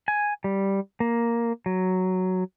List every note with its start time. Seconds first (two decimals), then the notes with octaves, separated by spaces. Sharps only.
0.08 G#5
0.44 G3
1.00 A#3
1.66 F#3